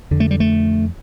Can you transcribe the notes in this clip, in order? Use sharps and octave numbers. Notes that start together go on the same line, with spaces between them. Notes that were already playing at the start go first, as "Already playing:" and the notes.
F2 D3
A3
G3
A3